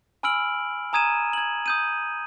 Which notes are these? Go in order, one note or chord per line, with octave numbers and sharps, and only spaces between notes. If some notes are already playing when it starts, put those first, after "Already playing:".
G#5 B5 E6 F6 D7 F#7
G#5 A#5 D#6 G#6 D#7 E7
G#6 F#7
D#6 G6 D#7